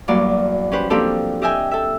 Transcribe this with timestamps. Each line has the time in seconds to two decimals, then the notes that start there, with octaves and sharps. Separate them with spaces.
0.08 E2 G2 F#3 A#3 D5
0.72 C#4 G4 B4 C5
0.90 F3 A#3 C4 D4 G4 A4
1.42 G4 D#5 E5 G5 G#5
1.71 A4 E5